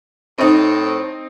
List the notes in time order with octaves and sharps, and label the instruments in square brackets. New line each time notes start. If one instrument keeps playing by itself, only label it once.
[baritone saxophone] A2 [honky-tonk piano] C4 D#4